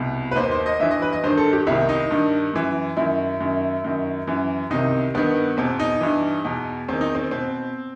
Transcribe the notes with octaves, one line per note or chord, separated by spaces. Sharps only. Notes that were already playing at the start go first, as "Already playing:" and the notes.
Already playing: C2 B2
B4
D#2 D#3 C5
C5
D#5
G2 E3 E5
D#5
B4
D#5
G2 D#3 C5
A4
G4
C2 C3 D#3 E4
D#4
G2 D#3
F#2 E3
F#2 D#3 E4
F#2 D#3
F#2 D#3
F#2 E3
C2 C3 D#3 D#4
G2 D#3 B3
E2 B2 C4
D#4
G2 E3
E2 B2
E2 D#3 C4
D#4
C4
B2 C4